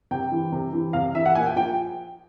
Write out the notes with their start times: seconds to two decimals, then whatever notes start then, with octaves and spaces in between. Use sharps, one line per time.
0.11 C3 G5
0.32 E3
0.52 C3
0.73 E3
0.93 C3 F5
1.14 E3 E5
1.26 F#5
1.35 A#2 G#5
1.46 G5
1.56 F3 G5